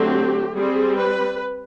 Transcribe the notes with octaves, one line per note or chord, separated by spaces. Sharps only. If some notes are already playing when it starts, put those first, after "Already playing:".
Already playing: D3 F#3 A3 C4 G4
G3 C4 G#4
B4